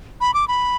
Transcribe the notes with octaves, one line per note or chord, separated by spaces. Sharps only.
B5
D6
B5